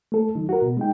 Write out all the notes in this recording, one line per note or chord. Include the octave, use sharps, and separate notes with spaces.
A3 A4
D#3 F#3 D#4
F#4 A#4
B2
G#3 D#4 G5